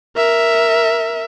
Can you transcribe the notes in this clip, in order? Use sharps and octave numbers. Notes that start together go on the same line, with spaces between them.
A#4 E5